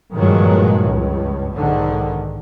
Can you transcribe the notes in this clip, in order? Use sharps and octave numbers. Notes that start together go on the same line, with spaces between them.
G2 A#2 D#3 F3 F#3 G#3
C#2 G2
B1 G#2 D3 D#3